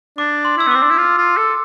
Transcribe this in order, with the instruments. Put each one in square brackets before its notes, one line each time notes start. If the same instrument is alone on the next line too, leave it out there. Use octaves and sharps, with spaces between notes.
[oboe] D4 [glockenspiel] D6
[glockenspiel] C6
[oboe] E4 [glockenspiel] E6
[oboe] B3
[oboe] C4 [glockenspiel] D6
[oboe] D4
E4
F4
F4
A4